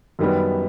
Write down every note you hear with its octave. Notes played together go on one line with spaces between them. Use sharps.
F#2 D#3 G3 B3